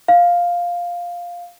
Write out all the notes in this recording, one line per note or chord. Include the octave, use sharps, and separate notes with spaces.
F5